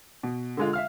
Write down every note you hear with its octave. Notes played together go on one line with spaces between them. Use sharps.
B2
D3 G#3 F4
E5 F5 F6